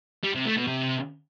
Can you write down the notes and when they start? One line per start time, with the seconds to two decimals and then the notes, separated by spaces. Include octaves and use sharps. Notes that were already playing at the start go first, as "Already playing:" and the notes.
0.23 G3
0.34 C3
0.46 A3
0.57 B2
0.68 C3